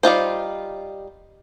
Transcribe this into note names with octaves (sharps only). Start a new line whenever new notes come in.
G3 D#4 F4 C5